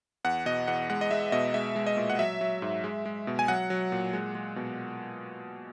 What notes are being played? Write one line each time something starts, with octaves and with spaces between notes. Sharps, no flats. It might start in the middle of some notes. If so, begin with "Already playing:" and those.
E2 F#5
B2 D#5
E2 F#5
G#3 F#5
D#5
G#3 E5
B2 D#5
G#3 E5
G#3
D#5
A#2
F#5
F#3 E5
F#3
G#2
G#3
G#3
B2
G#5
F#3 F#5
F#3
A#2
G#3
G#3
B2